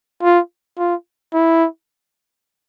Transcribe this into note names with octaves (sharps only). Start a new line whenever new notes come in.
F4
F4
E4